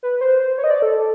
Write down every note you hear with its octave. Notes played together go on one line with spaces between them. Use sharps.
B4
C5
C5
C#5
D#5
D5
A4